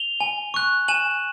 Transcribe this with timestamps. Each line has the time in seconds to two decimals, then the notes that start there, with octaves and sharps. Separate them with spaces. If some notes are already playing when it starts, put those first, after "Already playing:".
Already playing: F7 G7
0.20 G#5
0.54 C#6 F#6
0.88 G#5 E7 F#7